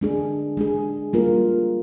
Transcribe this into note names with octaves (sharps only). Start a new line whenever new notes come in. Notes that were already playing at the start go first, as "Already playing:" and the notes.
G#3 D4 G#4
G#3 D4 G#4
G3 A#3 F4 A#4